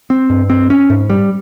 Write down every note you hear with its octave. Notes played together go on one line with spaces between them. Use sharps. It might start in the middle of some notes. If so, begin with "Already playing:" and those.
C4
G2
C4
C#4
G#2
G3